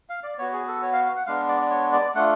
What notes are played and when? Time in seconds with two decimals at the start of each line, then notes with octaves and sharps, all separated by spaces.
0.09 F5
0.24 D5
0.38 B3 F#4 C#5
0.53 G#4
0.68 A4
0.82 C#5
0.93 F5
1.05 F5
1.16 F#5
1.26 G#3 B3 D4 F5
1.48 D5
1.61 D5
1.70 C#5
1.93 D5
2.14 A3 D4 F4 F#5